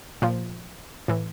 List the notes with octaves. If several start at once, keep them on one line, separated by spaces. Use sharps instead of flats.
A#2 F3
A2 E3